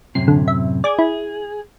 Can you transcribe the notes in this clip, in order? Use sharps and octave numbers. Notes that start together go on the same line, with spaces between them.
F#2 A2 C3 C7
D3
E5
G#4 D5 D6 G#6
E4